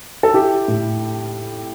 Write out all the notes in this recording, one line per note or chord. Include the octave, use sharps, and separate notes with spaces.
A4
E4 G4
A2